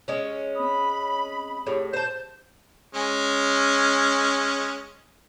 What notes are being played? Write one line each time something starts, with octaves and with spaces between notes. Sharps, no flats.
G#3 C#4
C4 B5 D#6
A2 G4 G#4 C#5
C5 A5 G6
G#3 C#4